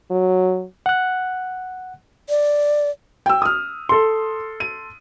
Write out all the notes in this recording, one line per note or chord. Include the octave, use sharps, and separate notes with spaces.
F#3
F#5 F#6
D5
G5 E6
D#6 F6
A4 C6
D#7